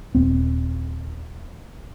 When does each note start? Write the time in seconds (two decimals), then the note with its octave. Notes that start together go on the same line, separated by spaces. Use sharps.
0.15 D#1 C4